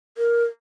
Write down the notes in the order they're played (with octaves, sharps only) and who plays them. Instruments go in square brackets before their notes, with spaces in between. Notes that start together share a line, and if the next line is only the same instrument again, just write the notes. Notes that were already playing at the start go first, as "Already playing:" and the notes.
[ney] A#4